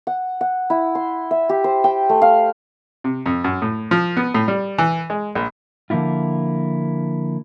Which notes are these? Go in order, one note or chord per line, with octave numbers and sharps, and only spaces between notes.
F#5
F#5
E4
C6
E5
G4
C5
G5
A3
F5
C3
F2
F#2
A2
F3
B3
A2
G3
E3
G#3
A#1
D3 F3 A#3 E4 F4